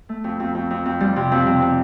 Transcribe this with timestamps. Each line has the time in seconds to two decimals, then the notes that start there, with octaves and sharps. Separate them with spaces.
0.09 A3
0.24 F2
0.40 F2
0.55 F2
0.70 F2
0.86 F2
1.00 G3
1.16 C3
1.32 F2
1.46 C3
1.62 C3